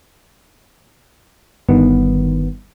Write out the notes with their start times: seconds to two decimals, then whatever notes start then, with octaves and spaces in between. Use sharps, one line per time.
1.69 G1 G2 D#3 B3